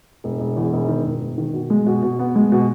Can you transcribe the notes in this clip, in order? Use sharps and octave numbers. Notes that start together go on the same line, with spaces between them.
E1
E1
E2
E1
D#3
E1
E1
D#3
B2
G#3
B2
B2
B3
G#3
B2